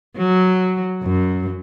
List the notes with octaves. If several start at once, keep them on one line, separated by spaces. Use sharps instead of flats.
F#3
F#2